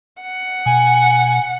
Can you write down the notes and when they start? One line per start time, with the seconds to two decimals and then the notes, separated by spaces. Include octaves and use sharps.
0.21 F#5
0.66 B2 G#5